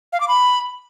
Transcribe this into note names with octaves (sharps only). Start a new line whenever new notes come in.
F5
D6
B5